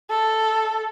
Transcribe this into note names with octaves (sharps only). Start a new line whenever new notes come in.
A4